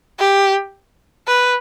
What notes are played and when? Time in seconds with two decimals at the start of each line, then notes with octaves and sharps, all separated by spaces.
0.19 G4
1.27 B4